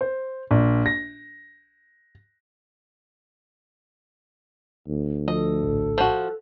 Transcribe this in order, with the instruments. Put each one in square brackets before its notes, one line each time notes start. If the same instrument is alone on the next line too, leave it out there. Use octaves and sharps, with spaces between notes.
[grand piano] C5
A#1
A#6
[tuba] D2
[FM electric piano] F3 [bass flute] A4 [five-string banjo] D#5
[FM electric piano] A#1 A2
[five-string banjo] F3 F#4